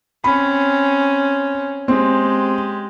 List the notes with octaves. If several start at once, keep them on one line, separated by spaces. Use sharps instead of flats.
C4 C#4 B5
G#3 C4 G4